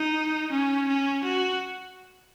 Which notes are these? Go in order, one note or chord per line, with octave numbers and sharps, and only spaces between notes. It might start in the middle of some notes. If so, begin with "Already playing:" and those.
Already playing: D#4
C#4
C#4
F#4